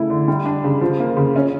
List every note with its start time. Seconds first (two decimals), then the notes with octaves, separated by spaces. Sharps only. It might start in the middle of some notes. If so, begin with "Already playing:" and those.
Already playing: C#3 A3 E4
0.10 D3
0.28 G3
0.45 D4
0.64 C#3
0.81 F3
1.00 A#3
1.17 C#3
1.36 C#4